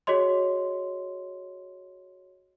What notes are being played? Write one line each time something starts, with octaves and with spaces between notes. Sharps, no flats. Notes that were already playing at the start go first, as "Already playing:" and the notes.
F#4 G#4 C#5 D#5 C6